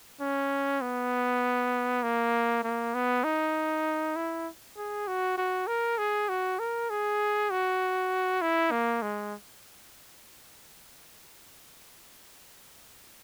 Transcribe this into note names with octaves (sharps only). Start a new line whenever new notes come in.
C#4
B3
A#3
A#3
B3
D#4
E4
G#4
F#4
F#4
A#4
G#4
F#4
A#4
G#4
F#4
E4
A#3
G#3